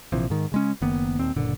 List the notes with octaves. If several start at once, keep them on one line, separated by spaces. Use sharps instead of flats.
A#1 C3 E3 F3
G#2 D#3
C#3 G#3 C#4
F#1 D#3 A#3 B3
D#1 D#2 C4
F#1 A#2 D3